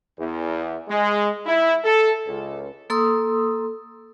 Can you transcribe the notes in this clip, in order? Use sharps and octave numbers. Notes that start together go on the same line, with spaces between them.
E2
G#3
E4
A4
C#2
A#3 A4 C6 D#6 E6